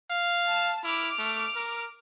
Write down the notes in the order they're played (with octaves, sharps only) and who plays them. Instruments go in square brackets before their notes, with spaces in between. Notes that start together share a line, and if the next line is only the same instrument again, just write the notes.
[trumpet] F5
[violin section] A5
[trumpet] E4 [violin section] D6 F6
[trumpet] A3
A#4